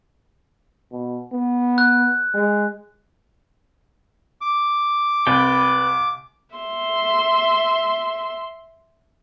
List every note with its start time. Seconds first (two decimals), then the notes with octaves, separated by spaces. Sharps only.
0.92 B2
1.32 B3
1.78 F#6
2.34 G#3
4.41 D6
5.27 C2 B4 D5 G5
6.55 E5 C6